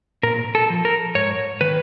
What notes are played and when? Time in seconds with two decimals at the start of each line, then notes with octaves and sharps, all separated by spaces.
0.23 A#2 A#4
0.55 A4
0.70 F3
0.85 A#4
1.15 G#2 C#5
1.61 D#3 B4